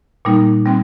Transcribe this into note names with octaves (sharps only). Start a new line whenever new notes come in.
A#2 G3 A#3 D#4
G3 C4